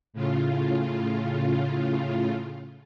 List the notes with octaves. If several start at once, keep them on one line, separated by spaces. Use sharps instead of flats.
A2 C#3 F4